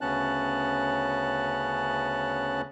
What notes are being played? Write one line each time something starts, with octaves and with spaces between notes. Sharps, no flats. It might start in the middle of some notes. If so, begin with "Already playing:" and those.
D2 C#3 B3 C#4 A5 F#6